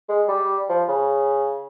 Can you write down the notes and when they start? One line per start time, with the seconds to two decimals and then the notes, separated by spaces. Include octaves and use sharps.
0.09 G#3
0.29 G3
0.69 F3
0.89 C#3